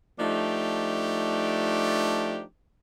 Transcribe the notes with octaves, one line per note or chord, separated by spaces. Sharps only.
F3 A3 D4 D#4 G4